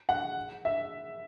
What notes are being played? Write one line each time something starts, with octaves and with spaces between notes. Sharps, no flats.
F#5
E5